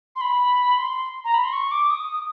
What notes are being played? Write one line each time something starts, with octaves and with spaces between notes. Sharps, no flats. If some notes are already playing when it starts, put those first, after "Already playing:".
C6
B5
C6
A#5
B5
C6
C#6
D6
D#6